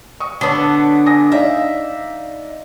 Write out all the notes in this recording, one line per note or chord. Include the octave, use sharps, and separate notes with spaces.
C#6 D#6
D3 B3 C#5 A5 D#6
G#5 D#6 A#6
D#4 D5 E5 F5